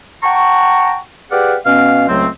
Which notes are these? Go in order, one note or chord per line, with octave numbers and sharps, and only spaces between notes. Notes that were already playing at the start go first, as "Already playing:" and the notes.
F#5 G5 A5 A#5 C#6
G4 G#4 B4 D5 F5 F#5
B2 B3 C#4 F5
C#2 F#3 A3 C4